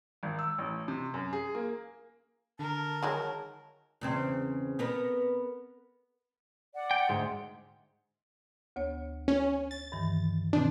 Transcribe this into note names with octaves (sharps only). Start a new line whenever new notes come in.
G#1
E6
A1
C3
F#2
G#4
A#3
D3 A#4 A5
D#3 F#3 G#3
E2 C#3 C4
B3 A#4 B4
D5 F#5
G5
D2 G#2 G#3
D2 B3 C#5
C#4
A6
G2 D#3 E3
B2 D#3 C4 D4